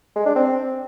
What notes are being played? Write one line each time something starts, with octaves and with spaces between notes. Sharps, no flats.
G#3
D4
C4